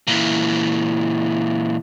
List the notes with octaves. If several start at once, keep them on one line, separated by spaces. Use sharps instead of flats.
A#2 E3